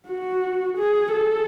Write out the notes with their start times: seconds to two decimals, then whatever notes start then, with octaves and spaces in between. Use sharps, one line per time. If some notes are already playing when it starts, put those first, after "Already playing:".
0.08 F#4
0.78 G#4
1.12 A4